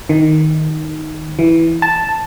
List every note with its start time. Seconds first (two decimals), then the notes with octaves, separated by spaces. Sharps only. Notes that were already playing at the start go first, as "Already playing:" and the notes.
0.09 D#3
1.39 E3
1.82 A5